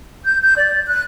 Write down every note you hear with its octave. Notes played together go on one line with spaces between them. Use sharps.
G6
G6
D5
F#6